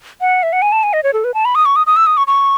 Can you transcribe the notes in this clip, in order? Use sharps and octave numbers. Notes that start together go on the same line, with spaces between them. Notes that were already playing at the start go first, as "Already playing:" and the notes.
F#5
E5
F#5
G#5
A5
G#5
D#5
C#5
A4
B4
A5
B5
D#6
C#6
D#6
D#6
E6
D#6
C#6
C#6